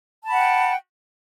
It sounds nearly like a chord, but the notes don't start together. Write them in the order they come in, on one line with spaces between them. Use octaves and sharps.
A5 B5 F#5 G5